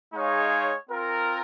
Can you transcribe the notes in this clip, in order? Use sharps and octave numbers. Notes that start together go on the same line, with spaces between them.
G#3 D#4 G#4 C#5 F5
C4 F4 A#4